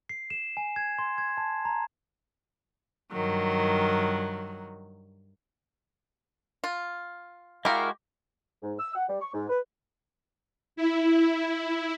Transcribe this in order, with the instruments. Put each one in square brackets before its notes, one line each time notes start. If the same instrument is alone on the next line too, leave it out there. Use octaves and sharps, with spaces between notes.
[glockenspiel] C7
E7
G#5
G#6
C6
G#6
A5
A#5
[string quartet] G2 D#3 F#3
[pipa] F4
[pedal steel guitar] G#3 F#4 [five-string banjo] E4 A#4 [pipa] G4 [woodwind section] F5
[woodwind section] G#2
E6
F#5
G3
C#6
G#2
B4
[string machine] E4